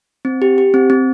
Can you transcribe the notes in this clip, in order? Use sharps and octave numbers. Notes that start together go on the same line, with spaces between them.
C4
G4
G4
C4
C4